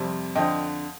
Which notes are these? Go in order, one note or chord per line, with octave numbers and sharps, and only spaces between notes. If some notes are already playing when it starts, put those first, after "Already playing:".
Already playing: F2 C3 G3
F2 D3 F3 D#5 G5